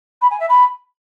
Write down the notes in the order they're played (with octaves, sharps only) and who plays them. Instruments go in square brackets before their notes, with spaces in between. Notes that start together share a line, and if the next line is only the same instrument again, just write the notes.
[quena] B5
G#5
E5
B5